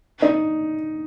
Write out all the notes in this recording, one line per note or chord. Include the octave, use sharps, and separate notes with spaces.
D#4